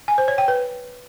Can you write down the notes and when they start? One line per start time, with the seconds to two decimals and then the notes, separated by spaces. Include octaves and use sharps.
0.08 G#5
0.18 C5
0.28 C#5
0.38 G5
0.48 B4